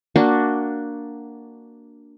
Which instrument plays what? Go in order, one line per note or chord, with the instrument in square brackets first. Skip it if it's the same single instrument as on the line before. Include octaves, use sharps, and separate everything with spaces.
[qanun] A#3 D4 F#4